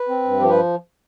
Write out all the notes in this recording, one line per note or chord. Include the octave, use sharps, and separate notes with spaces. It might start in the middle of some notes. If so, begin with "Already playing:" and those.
Already playing: B4
C4
G2
F3 G4
B4